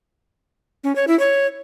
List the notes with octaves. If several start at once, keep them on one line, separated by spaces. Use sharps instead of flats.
C#4
C#5
E4
C#5